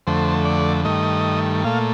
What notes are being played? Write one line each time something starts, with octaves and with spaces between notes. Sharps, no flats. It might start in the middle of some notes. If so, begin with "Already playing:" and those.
F2 D3 A3 C5
D5
G2 D#3 A3 D#5
A#2 A3 F5